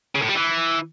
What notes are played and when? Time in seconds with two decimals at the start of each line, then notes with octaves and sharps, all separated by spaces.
0.15 C#3
0.22 A2
0.29 G3
0.36 E3